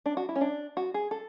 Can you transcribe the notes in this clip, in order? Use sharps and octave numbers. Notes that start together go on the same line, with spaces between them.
D4
F#4
E4
C#4
D4
F#4
G#4
A4